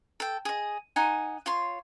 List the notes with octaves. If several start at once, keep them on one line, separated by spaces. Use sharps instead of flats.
A4 G5
G#4 D#5
D#4 F#5 G#5
F4 C#5 C6